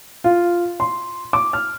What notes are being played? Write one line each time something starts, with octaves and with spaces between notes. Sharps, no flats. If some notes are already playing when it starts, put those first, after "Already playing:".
F4
C6
D6
F6